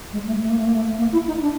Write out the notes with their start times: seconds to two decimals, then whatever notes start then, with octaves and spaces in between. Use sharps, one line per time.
0.13 G#3
0.26 A3
0.41 A3
0.50 A#3
0.57 A3
0.66 A#3
0.73 A3
0.98 A#3
1.12 E4
1.27 D#4
1.41 D4